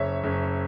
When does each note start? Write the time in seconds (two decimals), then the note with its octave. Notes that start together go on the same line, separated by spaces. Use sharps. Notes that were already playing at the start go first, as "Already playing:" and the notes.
Already playing: F#1 C#5 E5
0.24 F#1